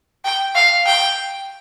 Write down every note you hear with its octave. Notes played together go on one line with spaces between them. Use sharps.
G5
F5
G5